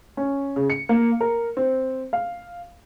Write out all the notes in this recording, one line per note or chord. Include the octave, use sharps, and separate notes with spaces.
C#4
C#3
C#7
A#3
A#4
C4
F5